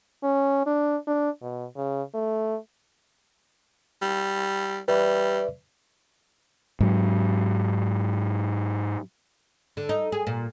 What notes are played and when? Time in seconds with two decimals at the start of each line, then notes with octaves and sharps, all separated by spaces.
0.24 C#4
0.67 D4
1.07 D4
1.42 B2
1.77 C#3
2.15 A3
4.02 G3
4.88 G3 B4 D5 E5
6.80 G#2 F#3
9.77 D3
9.89 D#4
10.12 G#4
10.27 A#2